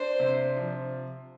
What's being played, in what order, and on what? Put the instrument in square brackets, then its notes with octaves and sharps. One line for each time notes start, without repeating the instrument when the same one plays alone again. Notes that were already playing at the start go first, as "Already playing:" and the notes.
Already playing: [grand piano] D4 [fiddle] C5
[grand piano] C3
F3